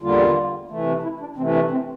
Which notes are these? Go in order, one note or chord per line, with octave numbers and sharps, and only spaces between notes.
E2 D3 G3 A#3 F4
C3 E3 A3
E4
D4
C3 E3 A3 C4
D4
C4